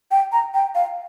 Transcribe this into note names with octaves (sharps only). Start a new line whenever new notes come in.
G5
A#5
G5
F5